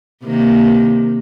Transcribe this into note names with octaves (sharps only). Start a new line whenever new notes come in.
C3 D#3 A#3